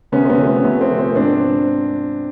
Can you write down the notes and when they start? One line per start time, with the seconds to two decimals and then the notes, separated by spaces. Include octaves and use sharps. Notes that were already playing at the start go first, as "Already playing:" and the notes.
0.12 C3 B3 C#4
0.25 C4
0.29 B3 C#4
0.38 F3 A3
0.47 C4
0.64 C3 B3
0.81 C4
0.90 F3 A3
0.98 C4
1.16 G#2 C4 D4